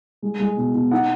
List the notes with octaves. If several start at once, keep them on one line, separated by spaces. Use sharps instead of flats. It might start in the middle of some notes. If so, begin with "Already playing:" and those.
G#3
G#3
B2
B2
D#4 F#5